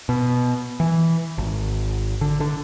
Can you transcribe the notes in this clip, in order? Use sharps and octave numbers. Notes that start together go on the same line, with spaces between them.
B2
E3
G#1
D3
D3